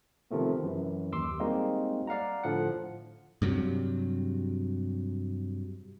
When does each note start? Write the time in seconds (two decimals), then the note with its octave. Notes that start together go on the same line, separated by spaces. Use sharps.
0.31 C3 D#3 F3 A3 B3
0.62 F#2 E3
1.13 D#2 C6 D6 E6
1.40 G3 G#3 A#3 C4 D#4 F#4
2.07 D5 F5 F#5 A#5
2.43 A2 D3 F3 F#5
3.42 G2 C3 F#3